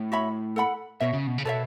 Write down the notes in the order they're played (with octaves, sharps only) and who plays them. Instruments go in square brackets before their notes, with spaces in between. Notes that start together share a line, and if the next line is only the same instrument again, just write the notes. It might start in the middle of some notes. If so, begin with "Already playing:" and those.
Already playing: [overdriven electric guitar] A2
[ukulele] F#4 C#5 E5 B5
A4 F#5 B5
[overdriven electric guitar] B2 [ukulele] F#4 C#5 E5
[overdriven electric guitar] C#3
B2
C#3
[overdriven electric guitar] B2 [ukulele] A4 C#5 E5